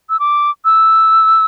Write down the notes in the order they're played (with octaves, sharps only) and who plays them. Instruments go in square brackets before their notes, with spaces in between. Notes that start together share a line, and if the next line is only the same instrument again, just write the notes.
[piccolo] E6
D6
E6